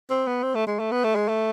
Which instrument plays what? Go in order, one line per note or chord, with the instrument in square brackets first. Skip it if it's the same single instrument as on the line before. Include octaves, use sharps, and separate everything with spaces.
[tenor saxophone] C4
B3
C4
A3
G#3
A3
B3
A3
G#3
A3